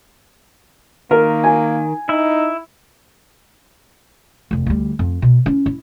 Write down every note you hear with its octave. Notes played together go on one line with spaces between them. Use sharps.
D#3 A#3 A#4
G#5
D#4 E4 E5
F1 F2
D2 G3
F2
B2
C#4 E4
E4